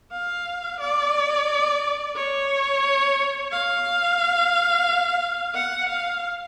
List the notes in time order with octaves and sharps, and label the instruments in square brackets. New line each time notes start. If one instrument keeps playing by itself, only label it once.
[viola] F5
D5
C#5
F5
F#5
F5